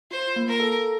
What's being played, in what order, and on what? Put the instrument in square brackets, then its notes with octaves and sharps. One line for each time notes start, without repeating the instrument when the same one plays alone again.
[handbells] F4 [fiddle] C5
[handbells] A#3
[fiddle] A#4
[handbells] A4